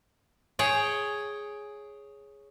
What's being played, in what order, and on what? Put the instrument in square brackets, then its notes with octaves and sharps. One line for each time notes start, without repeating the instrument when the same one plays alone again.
[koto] G#4 C#5 G5